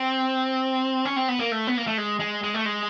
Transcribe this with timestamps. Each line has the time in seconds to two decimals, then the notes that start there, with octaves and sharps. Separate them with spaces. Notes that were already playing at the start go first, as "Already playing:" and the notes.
Already playing: C4
1.05 C#4
1.16 C4
1.28 B3
1.39 A#3
1.52 A3
1.67 B3
1.77 A#3
1.87 A3
1.98 G#3
2.19 G#3
2.43 G#3
2.54 A3
2.66 G#3